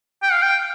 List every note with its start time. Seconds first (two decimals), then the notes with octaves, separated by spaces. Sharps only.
0.23 G5
0.33 F5
0.42 G5